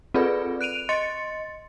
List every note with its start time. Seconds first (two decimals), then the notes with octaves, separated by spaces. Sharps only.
0.14 C4 F4 G#4 A4 B4 D5
0.61 F#6 D7 D#7 F7
0.89 D#5 C6 A6 C#7